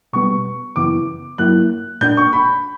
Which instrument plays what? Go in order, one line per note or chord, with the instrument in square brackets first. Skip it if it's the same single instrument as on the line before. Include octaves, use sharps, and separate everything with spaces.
[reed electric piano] B2 G3 B3 [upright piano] C#6
[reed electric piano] F#2 C#3 E3 B3 E4 [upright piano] D6
[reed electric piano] G2 F#3 A#3 E4 [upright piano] F#6
[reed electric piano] A#2 A#3 D4 [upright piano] G6
[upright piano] C#6
B5